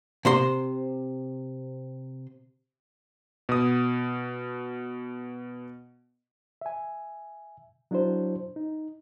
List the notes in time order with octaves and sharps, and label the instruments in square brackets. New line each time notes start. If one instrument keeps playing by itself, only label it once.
[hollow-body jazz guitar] C3 C5 C6
[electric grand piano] B2 D#6
[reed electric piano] E5 G#5
F#3 D4 E4 F#4 C5
D#4